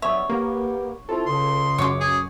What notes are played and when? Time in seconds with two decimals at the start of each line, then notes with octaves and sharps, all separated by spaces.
0.02 G2 F#3 B3 C#5 E5
0.30 A#3 B3 G4
1.09 C4 E4 F4 A4
1.26 C#2 C#3 C6
1.79 F#2 C#5 D6
2.00 G#4